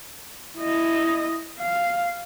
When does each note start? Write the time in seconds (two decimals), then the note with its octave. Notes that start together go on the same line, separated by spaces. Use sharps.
0.58 E4 D#5
1.60 F5